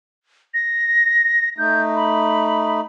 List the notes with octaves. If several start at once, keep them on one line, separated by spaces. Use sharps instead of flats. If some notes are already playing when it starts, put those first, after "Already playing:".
A#6
A3 D#4 G6
B5